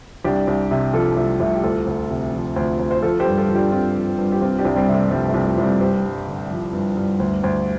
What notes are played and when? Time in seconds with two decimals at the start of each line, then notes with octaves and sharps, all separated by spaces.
0.24 C2 D4 G4
0.47 C2
0.71 C3
0.93 F3 F4 A4
1.17 C2 A3
1.40 C2 A3
1.54 G4
1.63 D2 F4 A4
1.86 D2
2.10 C3
2.33 F3
2.56 D2
2.79 D2
2.91 C5
3.02 F3 F4 A4
3.20 G4 C5
3.26 G2
3.37 F4 A4
3.49 F3 F4
3.55 D4 G4
3.72 G2 C4 F4
3.95 F3
4.18 G2
4.32 G4
4.42 C2 C4 F4
4.59 D4 G4
4.65 C2
4.76 G3 C4
4.88 C3
4.94 A3
5.11 F3 G3
5.28 A3
5.34 C2
5.46 A3
5.58 C2
5.63 G3 C4
5.81 G2 G4 C5
6.04 G2
6.27 D3
6.51 F3
6.73 G2
6.97 G2
7.20 D2
7.43 D2